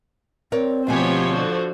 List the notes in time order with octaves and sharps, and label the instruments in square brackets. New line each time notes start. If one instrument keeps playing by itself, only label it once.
[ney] C4 [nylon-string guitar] A#4 C#5 D5
[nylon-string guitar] D2 B2 G#5 [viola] F3 C5 [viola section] B3 G4 C#5
[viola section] D3 F#4